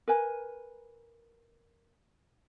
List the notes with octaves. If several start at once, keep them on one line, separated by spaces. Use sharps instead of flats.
A#4 B4 G#5